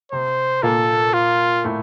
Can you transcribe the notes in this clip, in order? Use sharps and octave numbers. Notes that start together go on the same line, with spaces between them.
C3 C4 C5
A#2 A#3 A4
F4
A2 A3